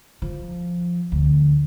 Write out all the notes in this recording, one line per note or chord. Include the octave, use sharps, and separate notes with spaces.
F3
D2